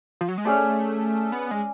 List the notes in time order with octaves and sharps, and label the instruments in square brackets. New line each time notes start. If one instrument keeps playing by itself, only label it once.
[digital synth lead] F3
F#3
G#3
[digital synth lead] A3 [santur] C#4 G#4 D5
[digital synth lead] B3
G#3